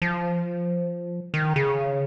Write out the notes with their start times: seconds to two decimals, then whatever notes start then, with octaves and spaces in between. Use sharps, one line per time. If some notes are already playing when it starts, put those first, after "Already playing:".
0.02 F3
1.34 D#3
1.56 C#3